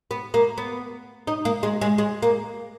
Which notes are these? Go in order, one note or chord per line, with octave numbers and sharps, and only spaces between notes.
B3
A#3
B3
D#4
A#3
G#3
G#3
G#3
A#3